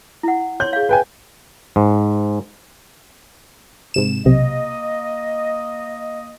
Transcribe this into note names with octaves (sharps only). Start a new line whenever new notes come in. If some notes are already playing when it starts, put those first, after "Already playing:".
E4 F#5
C#5 C6 G6
G#4 F5
B4 G5 G#5
G#2
G#2 C3 E7
B1 C3 A#3 D#5